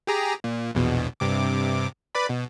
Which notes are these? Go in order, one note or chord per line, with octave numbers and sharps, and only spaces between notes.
G4 G#4 A#5
A#2
A#1 E2 B2
G2 C3 D6
B4 D5 B5
B2